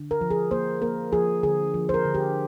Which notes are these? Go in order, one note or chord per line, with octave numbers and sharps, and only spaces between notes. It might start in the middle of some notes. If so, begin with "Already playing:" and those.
Already playing: D3
A#4
F3
G#4
A#3 C5
A#3 A#4
F3 G#4
D3 G#4
F3
C5
A#4
D3
G4